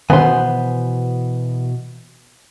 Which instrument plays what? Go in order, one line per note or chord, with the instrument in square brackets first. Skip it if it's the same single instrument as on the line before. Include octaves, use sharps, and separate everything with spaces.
[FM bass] B2 [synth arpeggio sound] D#3 [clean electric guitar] E3 G#5 [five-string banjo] B3 C5